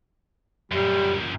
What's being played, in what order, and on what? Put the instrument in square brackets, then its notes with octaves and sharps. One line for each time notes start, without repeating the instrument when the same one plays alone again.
[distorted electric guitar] F#2 A#2 [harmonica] G3